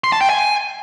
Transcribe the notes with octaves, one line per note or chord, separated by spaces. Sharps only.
C6
A5
G5
G#5